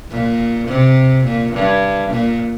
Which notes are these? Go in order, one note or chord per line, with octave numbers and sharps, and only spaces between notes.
A#2
C3
A#2
G2
A#2